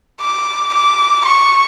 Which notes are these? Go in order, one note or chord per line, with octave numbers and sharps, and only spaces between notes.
D6
D6
C#6